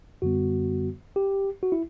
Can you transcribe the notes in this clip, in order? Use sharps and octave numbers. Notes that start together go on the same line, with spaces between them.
F#2 D3 G3 B3 F#4
G4
F#4
E4